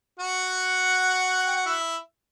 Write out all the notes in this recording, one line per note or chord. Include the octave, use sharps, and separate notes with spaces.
F#4 F#5
G5
F#5
E4 E5